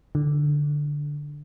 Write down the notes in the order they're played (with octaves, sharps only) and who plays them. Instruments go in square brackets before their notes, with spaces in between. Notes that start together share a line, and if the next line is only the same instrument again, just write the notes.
[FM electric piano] D3